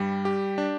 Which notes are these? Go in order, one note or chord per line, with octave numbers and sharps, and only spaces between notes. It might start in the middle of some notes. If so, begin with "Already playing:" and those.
Already playing: G2 G3
G4
D4